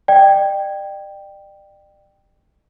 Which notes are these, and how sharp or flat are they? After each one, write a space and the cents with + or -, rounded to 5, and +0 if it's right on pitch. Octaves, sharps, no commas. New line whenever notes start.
D5 +40 G5 +0